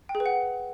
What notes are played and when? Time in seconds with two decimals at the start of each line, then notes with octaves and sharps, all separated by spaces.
0.09 G5
0.15 G#4
0.20 B4
0.26 F#5